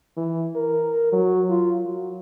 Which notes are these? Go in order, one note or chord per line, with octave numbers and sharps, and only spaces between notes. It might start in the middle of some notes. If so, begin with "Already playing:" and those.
E3
A#4
F#3
F4
F#3